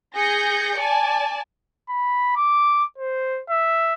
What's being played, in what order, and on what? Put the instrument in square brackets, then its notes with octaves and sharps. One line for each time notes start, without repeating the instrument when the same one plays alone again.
[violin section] G#4 G6 A#6 C#7
D5 G#5 A5
[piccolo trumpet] B5
D6
C5
E5